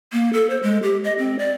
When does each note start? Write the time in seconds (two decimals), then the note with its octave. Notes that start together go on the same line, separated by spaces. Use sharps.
0.12 A#3
0.33 A4
0.50 C5
0.63 G#3
0.83 G4
1.04 D#5
1.18 C4
1.39 D5